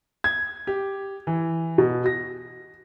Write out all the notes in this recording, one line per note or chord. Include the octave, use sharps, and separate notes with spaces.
G#6
G4
E3
B2
A#6